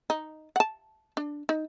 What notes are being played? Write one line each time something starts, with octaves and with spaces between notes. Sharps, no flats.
D#4
F#5 A5
D4
D#4